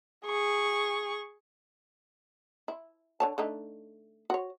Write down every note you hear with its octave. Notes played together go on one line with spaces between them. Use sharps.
G#4 C#6
E4
D3 C#5 A5
D3 A3 D#4
F#4 C#5